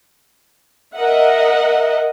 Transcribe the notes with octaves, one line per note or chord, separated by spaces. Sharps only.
A#4 D#5 E5 F#5